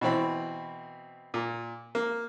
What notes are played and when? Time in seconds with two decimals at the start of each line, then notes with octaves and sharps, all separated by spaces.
0.01 B2 E3 C4 B5
1.34 A#2
1.95 A#3